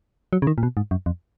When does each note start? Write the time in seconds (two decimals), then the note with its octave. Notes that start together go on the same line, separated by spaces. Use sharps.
0.33 F#3
0.42 C#3
0.47 D#3
0.58 A#2
0.63 B2
0.77 G#2
0.91 F#2
1.06 F2